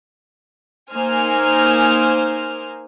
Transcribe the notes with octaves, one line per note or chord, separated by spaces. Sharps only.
A#3 D#4 C5 G#5 F6